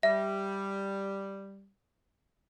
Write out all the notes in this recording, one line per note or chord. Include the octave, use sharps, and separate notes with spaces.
G3 E5